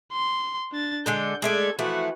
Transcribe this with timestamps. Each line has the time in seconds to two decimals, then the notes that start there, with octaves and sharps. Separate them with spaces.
0.12 C6
0.72 D4 A6
1.06 D3 G#3 A4 G6
1.42 G#3 A3 A4 D5 G#6
1.79 E3 F3 A3 F#4 B4